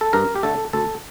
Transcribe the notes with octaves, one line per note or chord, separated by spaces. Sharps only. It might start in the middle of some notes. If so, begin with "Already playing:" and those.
A4
G2 A#4
G4
D3 A3 A4
D2 A4